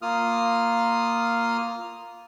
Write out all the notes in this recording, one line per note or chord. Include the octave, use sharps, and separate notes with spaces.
A#3 F4 D#6 F6